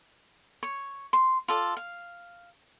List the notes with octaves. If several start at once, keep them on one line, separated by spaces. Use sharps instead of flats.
C#5
C6
F4 A4 D5
F5